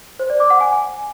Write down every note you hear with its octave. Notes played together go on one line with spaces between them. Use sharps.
C5
D5
D6
F#5
G#5